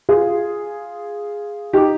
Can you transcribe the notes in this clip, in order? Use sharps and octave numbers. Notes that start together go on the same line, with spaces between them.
F4 G#4
D#4 G4